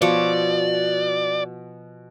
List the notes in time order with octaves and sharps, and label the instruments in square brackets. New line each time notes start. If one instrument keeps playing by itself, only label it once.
[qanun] B2 F3 C#5 [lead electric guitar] D5